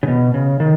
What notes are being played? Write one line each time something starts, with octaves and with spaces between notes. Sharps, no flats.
C#3
B2
C#3
D#3